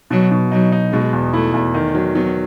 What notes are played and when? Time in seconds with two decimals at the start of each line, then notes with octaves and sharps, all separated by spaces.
0.10 B2 F#3
0.31 B2
0.52 F#3 D#4
0.72 D#4
0.92 B2 G#3
1.13 E2
1.33 A3 E4
1.54 E2
1.74 D#3
1.95 F#3
2.15 F#3 B3